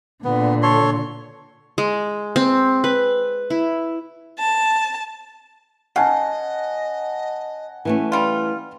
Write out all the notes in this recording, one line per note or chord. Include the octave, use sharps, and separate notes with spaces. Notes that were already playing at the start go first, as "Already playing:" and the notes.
A#2 D3 B3
A4 C#5 C6
G#3
C4
B4
E4
A5
C#3 D#5 F#5 G#5 A5
E3 A3 C#4
G3 F4 F6